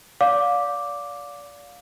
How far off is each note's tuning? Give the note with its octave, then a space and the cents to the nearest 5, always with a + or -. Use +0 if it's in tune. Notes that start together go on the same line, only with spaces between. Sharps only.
D5 -30 F5 +25 D6 +0